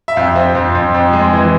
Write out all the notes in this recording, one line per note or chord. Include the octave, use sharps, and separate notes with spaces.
E5
F2 F5
C4
F2
F2
F2
G#3
E3